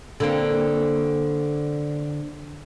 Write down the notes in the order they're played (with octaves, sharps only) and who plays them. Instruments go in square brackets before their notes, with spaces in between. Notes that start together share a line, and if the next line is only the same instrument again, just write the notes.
[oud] D3 A#3 C4